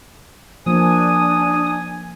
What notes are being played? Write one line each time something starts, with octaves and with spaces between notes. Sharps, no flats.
F3 A#3 D4 G#5 D#6